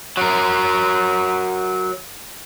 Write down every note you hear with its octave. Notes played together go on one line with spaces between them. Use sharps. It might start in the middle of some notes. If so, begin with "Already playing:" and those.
F#3 A#4